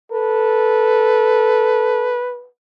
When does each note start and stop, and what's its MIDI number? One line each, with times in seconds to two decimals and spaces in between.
0.12 2.18 69
0.12 2.48 71